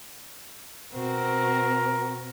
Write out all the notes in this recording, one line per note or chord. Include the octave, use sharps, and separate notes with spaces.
B2 C4 F#4 A#4